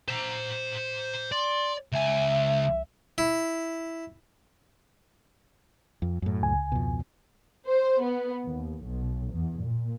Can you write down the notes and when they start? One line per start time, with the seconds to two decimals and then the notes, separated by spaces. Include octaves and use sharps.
0.08 C5 A#5
1.32 D5 C6
1.92 C#2 E5 G#5
3.18 E4
6.02 F2
6.22 F#2 A2
6.43 C#2 G#5
6.72 F2 B2
7.66 C5
8.01 B3
8.45 D#2
8.84 B1
9.32 E2
9.63 A#2